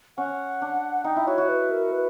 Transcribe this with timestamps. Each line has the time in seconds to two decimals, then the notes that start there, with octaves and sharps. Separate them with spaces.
0.18 C#4 F#5
0.62 D4
1.04 D#4 G5
1.16 E4
1.27 F#4 C#5
1.38 F#4
1.49 B4
1.71 A#4
1.92 B4